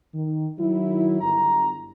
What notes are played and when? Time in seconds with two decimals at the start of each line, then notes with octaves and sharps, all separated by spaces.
0.13 D#3
0.58 D#3 F#3 E4
1.21 G1 A#5